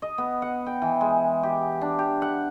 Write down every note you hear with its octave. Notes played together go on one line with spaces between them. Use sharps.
D#5
B3
F#5
G5
E3
G#3
G4
D4
G4
F#5